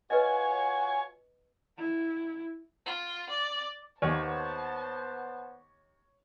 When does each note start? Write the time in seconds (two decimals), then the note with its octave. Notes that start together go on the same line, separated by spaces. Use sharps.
0.10 F4 F#4 B4 C#5 D#5 G#5
1.78 E4
2.86 F4
3.30 D5
4.02 D#2 B3 C5 C#5 A5